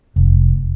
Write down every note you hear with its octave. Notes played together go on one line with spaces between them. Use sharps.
F1